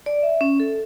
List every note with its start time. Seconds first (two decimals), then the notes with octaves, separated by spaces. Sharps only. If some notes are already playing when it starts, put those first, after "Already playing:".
0.06 D5
0.23 E5
0.41 C#4
0.60 A4